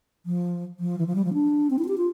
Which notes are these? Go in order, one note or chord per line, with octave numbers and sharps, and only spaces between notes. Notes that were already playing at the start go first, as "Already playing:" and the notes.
F3
F3
E3
F3
G3
F3
D4
C4
E4
F4
G4
F4